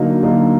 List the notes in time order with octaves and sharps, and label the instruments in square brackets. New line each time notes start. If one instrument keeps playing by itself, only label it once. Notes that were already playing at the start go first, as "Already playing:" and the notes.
Already playing: [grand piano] D3 F#3 A#3 D#4
D3 F#3 A#3 D#4